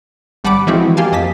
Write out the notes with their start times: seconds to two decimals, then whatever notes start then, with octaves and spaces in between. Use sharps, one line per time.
0.44 G#1 G3 F#5 A5 B5 D6
0.67 E3 F3 G#3 C4 E4 F#4
0.97 A#3 G4 F5 G#5 A5
1.12 F2 D#5 A5 B6